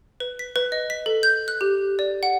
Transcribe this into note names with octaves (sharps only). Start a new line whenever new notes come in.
B4
B6
B4
D#5
B6
A4
G6
F#6
G4
D5
F#5